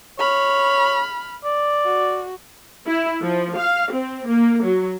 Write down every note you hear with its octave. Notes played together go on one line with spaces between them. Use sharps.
C#5 B5 F6
D5
F#4
E4
F3
F5
C4
A#3
F#3